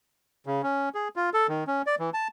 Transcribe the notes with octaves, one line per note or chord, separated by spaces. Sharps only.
C#3
C#4
G#4
F4
A4
D#3
C#4
D5
E3
A5